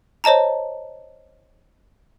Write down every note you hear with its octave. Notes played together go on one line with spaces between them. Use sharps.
C5 C#5 D#5 A5 A#5